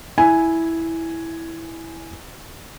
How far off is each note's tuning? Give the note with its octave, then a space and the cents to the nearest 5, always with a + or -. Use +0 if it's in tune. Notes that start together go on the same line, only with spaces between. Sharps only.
E4 -5 G#5 +0